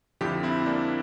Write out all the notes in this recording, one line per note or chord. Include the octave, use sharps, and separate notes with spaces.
F2 D3 F3 E4 G4
C4 E4
A#3 D4